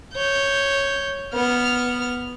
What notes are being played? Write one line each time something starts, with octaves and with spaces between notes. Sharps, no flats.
C#5 G6
B3 F6